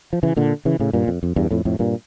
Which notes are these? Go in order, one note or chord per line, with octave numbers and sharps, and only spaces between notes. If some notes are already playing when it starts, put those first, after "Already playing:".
F3
C#3 E3
A#2 D3
C#3 E3
A2 C#3
G2 A#2
F2
F2
E2 G2
F2 A2
F2 A2
G2 A#2